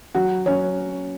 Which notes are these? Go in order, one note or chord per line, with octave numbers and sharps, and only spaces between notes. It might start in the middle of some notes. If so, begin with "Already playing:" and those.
F#3 F#4 F#5
F#3 C#4 C#5